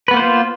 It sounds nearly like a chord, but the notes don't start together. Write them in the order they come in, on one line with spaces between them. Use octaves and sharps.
B4 B3 A#3 C5 F4